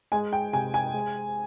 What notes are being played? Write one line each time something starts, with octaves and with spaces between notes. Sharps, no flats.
G#3 G#5
G5
C3 G#5
G#5
G#3